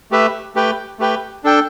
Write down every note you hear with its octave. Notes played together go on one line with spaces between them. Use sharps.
A3 G4 B4 E5
A3 G4 B4 G5
A3 G4 B4 G5
D4 A4 G5